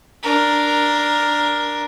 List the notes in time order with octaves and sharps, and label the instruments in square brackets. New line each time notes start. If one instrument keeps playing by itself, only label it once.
[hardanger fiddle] D4 A#4